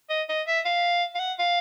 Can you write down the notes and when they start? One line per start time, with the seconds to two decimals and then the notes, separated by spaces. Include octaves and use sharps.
0.10 D#5
0.29 D#5
0.48 E5
0.65 F5
1.15 F5
1.20 F#5
1.39 F5